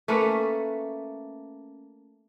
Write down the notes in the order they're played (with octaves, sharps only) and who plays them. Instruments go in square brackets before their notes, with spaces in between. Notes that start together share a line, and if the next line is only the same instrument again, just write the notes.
[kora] A3 A#3 C#4 B4